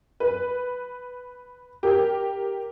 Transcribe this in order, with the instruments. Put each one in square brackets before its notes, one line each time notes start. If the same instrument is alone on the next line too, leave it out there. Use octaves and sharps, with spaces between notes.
[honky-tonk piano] B4
G4 A#4